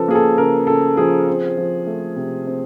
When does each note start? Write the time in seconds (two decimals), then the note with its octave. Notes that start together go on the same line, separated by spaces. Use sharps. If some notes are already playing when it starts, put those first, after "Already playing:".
Already playing: C#3 F3 A4 B4
0.08 A#3 G#4
0.15 A4
0.37 C#3 A#4
0.67 C#3 A4
0.97 F3 G#4
1.28 C4
1.57 F3
1.87 A3
2.16 C3
2.47 C4